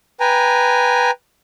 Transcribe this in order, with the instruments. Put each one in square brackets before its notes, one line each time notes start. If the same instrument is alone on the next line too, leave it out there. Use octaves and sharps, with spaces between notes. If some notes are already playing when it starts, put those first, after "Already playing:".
[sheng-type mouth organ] B4 G5 G#5 A#5